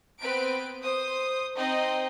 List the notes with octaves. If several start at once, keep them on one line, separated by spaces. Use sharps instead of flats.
B3 C4 B4 D7
C5 D#6
C4 D#4 C5 D#5 G5